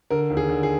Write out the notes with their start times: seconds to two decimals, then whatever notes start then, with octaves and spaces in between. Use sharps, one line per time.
0.11 D3 A#4
0.30 D#2
0.37 G#4
0.49 D3
0.63 G#4